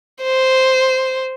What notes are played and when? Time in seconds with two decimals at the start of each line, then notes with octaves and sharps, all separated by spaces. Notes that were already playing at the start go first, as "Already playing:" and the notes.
0.23 C5